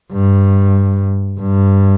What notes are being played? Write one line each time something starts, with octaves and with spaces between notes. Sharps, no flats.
G2
G2